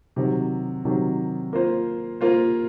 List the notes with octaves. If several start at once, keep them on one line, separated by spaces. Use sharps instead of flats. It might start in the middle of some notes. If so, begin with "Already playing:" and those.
C3 D#3 F#3
C3 D#3 F#3
A#3 F4 C5
A#3 F4 C5